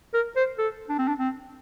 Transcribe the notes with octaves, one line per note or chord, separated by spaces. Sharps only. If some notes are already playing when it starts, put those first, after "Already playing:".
A#4
C5
A4
D4
C4
D4
C4